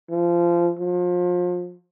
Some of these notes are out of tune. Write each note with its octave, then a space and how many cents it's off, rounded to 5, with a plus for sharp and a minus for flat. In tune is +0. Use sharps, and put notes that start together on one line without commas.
F3 -20
F3 +30